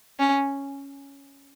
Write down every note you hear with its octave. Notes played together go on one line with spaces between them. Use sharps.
C#4